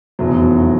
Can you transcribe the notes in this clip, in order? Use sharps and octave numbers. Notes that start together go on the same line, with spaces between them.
F1 E2 B2 F#3